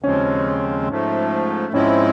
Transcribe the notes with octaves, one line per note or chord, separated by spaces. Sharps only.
D#2 C#3 F3 G#3 C4 C#4
G#2 F3 A3
G#2 F3 G#3 C4 C#4 E4